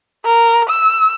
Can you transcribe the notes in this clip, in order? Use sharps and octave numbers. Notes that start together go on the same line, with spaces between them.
A#4
E6